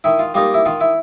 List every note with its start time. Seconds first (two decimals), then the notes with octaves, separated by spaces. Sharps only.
0.04 D#3 E4
0.19 F4
0.34 G3 A#3 D#4 F4
0.54 E4
0.66 D#3 F4
0.81 E4